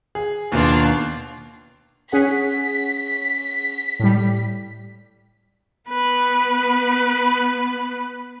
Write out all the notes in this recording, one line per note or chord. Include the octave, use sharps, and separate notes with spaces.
G#4
D#2 B2 A#3 D4 F4
C#4 G#4 F#5 B6
A2 G3
B3 B4